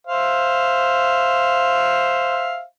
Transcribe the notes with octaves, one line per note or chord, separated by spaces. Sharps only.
C5 E5 F5